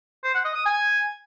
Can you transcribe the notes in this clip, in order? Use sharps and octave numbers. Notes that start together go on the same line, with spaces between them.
C5
F#5
D#5
D#6
G#5